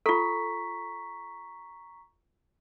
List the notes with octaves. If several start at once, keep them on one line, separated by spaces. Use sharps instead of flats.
F4 A4 A#5 C#6 B6